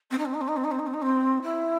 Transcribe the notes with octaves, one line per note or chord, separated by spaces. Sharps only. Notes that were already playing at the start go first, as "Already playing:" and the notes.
C4
D#4
C4
D#4
C4
D#4
C4
D#4
C4
D#4
C4
D#4
C4
E4